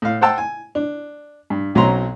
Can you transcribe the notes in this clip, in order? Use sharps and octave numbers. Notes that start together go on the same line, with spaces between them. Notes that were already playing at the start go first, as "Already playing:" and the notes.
A2 F5
C5 F#5 G5 A5 E6
G#5
D4
G2
B1 F#3 C4 C#4 A#5 C6